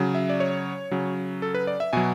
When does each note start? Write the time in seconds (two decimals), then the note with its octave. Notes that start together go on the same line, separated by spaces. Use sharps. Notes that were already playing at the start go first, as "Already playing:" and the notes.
Already playing: C#3 F#3
0.15 E5
0.30 D5
0.40 C#5
0.91 C#3 F#3
1.42 A4
1.54 B4
1.67 D5
1.80 E5
1.93 B2 F#3 G#5